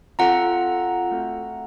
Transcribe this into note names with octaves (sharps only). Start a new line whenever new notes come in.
C4 F4 A4 F#5 A#5
A3 C4 F#4 A4